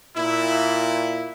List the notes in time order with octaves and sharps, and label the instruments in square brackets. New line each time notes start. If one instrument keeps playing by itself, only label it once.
[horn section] A#2 E4